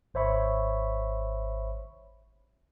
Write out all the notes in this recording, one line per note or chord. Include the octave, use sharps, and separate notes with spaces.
G#1 C5 C#5 E5 B5 C#6